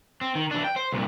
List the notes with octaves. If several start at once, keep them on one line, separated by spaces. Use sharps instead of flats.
C4
D#3
E3 D4
G5
C5
C2 A#2